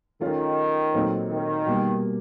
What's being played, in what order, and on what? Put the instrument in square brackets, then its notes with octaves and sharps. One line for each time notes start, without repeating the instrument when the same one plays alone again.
[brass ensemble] D#3 [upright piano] A3 C#4 F4
[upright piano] A#2 F#3 A3 C4 D#4
[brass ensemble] D#3
[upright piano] B2 G3 A#3